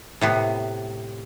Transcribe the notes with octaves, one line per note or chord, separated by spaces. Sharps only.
A2 C3 B3